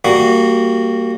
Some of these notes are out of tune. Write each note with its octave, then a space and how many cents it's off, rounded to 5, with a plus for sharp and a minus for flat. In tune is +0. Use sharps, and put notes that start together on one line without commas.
G3 +0 A#3 -20 F#4 +0